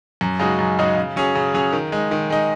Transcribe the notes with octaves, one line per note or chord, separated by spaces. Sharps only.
F#2
C#3 G#3 D#4 F#4
F#2
C#3 G#3 D#4 F#4
C#3
F#3 C#4 G#4
C#3
F#3 C#4 G#4
D#3
G#3 D#4
D#3
G#3 D#4